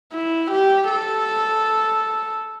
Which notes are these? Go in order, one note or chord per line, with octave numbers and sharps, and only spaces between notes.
E4
G4
A4